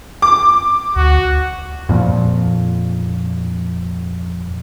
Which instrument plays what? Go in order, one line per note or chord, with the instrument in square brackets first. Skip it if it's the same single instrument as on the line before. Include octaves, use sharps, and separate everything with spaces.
[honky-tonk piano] D6
[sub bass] D2 [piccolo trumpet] F#4
[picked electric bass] F2 A#2 F3